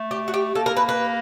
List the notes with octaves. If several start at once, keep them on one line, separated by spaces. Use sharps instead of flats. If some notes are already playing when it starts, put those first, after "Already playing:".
Already playing: A3
G4
F#4
G4
A#3 A4
A#4
B4
B4